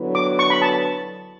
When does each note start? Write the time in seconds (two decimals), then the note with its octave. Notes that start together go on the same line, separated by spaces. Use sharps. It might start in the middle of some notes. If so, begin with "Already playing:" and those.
Already playing: D3 F#3 B3 E4 B4
0.15 D6
0.39 C#6
0.50 B5
0.62 A5